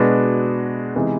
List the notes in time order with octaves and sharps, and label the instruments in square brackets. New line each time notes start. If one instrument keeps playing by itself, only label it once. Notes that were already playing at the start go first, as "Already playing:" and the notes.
Already playing: [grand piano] B2 G#3 B3 D4 F#4
C3 E3 G#3 B3 D#4